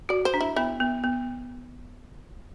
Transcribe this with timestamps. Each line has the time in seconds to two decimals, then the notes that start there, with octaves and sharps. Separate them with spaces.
0.09 F#4 D5
0.25 C5
0.34 D4
0.41 E4
0.56 B3 E4
0.80 B3
1.04 B3